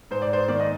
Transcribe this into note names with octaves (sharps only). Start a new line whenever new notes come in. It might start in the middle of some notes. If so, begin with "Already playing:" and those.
G#2 C5
D5
C5
D#3 D5
D#5